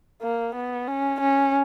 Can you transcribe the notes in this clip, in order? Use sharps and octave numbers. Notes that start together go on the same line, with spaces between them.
A#3
B3
C#4
C#4